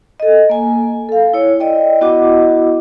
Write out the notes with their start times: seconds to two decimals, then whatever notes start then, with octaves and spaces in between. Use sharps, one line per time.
0.20 A4 D#5
0.49 A#3 G#5
1.09 A4 F5
1.33 E4 C#5
1.60 D5 D#5 G5
2.01 B3 E4 F#4 D#5 F#5 D6